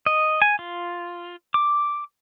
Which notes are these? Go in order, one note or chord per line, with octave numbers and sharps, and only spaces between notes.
D#5
G#5
F4
D6